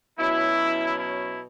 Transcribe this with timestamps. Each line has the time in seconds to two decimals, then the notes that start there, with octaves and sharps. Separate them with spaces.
0.19 B2 F#3 C#4 E4
0.99 E4